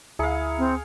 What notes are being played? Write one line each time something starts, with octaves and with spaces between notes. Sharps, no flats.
D2 E4 G#4 F5 A#5 C#7
C4